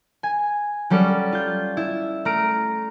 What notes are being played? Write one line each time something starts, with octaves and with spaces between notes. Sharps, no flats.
G#5
F#3 G3 C#4 A4 D5
F4 G6
E4
A3 A#5 F6 D7